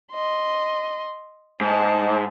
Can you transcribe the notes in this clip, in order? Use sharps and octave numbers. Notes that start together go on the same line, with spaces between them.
D#5 C6
G#2 A5